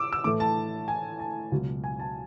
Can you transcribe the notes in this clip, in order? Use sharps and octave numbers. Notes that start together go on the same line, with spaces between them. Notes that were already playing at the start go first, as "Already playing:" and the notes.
Already playing: D6 E6
E6
A2 E3 A3 D6
A5
G#5
A5
C#2 B2 F#3
G#5
A5